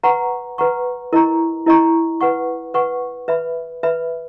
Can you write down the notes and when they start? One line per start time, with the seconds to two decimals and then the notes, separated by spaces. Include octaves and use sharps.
0.03 B4 F#5 A#5 C#6
0.58 B4 F#5 A#5 C#6
1.13 E4 A#4 D#5 A#5 C#6
1.66 E4 A#4 D#5 A#5 C#6
2.21 B4 F#5 C#6
2.74 B4 F#5 C#6
3.28 B4 E5 B5
3.83 B4 E5 B5